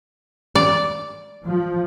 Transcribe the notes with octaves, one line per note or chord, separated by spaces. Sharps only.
D5
F3